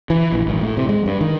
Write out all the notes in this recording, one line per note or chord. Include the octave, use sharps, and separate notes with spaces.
E3
A#1
G#1
A2
C3
G#3
G2
D#3